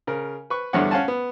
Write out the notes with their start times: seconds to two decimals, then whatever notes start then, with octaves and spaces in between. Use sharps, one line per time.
0.07 C#3 A#4
0.50 B4 C#6
0.73 E2 G2 D3 C#5 F#5
0.91 C#4 F5 F#5 G#5 A5
1.08 B3